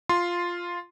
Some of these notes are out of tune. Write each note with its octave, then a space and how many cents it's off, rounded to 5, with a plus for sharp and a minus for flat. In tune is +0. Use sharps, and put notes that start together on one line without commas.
F4 +0 C6 +0